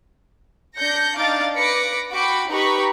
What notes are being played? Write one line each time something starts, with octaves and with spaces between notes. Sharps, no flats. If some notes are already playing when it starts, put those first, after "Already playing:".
D4 G6 A#6 C#7
D4 D#4 F5 D6 A6
B4 D6 A#6 B6 C#7
F#4 G5 B5 D6 C#7
D#4 G4 B4 A#5 B5 C#6